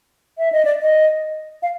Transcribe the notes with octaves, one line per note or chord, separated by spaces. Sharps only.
E5
D#5
D5
D#5
F5